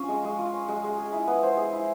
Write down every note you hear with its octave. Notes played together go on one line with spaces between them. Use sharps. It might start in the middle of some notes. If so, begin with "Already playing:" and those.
Already playing: C#4 F4
G#3
G#3
F4
C#4
G#3
G#3
G#4
E4
B3
C5
G#4
E4